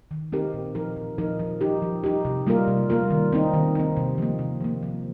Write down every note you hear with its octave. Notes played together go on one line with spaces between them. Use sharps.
D#3
C4 D#4 G4 A#4
A#2
F3 D#4 A#4
A#2
F3 D#4 A#4
F3
D#4 G4
F3
D#4 G4
C3
G3 A#3 F4 A#4
C3
G3 A#3 F4 A#4
D#3
C4 D#4
D#3
C4 D#4
C3
F3 A#3
C3
F3 A#3
F3